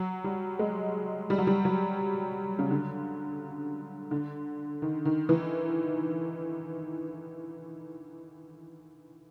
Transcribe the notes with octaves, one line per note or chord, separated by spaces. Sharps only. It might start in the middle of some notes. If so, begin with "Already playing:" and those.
Already playing: F#3
G3
G#3
G3
F#3
G3
F#3
C#3
D3
D3
D#3
D#3
E3